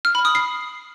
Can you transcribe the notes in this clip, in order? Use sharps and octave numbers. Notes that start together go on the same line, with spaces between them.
F6
B5
D#6
C7